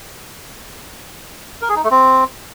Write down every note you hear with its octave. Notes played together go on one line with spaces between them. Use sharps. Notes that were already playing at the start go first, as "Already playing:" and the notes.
A#4
G#4
D#4
A3
C4